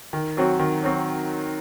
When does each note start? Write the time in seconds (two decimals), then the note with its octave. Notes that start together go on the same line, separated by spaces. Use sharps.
0.13 D#3
0.37 F#3 C4 F#4
0.59 D#3
0.83 F#3 C4 F#4